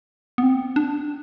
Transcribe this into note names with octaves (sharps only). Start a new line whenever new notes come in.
B3
C4
D4